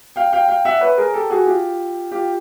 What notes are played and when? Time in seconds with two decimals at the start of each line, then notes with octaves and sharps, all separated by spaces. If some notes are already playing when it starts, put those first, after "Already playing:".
0.16 F5 G5
0.33 F5 G5
0.48 F5 G5
0.65 E5 F#5
0.81 B4 C#5
0.97 G#4 A#4
1.14 G4 A4
1.30 F#4 G#4
1.46 F4 G4
2.11 F4 G4